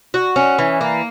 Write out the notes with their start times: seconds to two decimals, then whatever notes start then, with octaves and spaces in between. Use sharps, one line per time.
0.14 F#4
0.36 C#4
0.59 E3
0.81 A#3